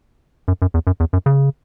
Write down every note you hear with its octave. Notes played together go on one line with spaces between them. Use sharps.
F#2
F#2
E2
F#2
E2
F#2
C#3